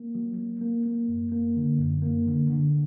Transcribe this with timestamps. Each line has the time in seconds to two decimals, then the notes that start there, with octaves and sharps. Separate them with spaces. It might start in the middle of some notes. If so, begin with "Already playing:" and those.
Already playing: A#3
0.15 F#3
0.38 A#3
0.61 A#3
0.86 A#3
1.08 F#2
1.32 A#3
1.56 D3
1.79 F#2
2.02 A#3
2.26 D3
2.50 D3